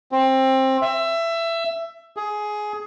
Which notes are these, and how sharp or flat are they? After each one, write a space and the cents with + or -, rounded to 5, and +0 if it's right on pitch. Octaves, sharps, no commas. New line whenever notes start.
C4 +20
E5 +20
G#4 +15